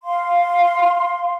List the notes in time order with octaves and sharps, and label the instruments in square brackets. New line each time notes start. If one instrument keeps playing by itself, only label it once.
[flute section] F5 C6